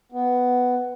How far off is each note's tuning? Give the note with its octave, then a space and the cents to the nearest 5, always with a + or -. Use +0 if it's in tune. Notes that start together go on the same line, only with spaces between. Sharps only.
B3 +10